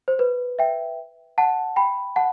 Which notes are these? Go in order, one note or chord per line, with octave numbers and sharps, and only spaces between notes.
C5
B4
E5 G5
F#5 A5
G5 B5
F#5 A5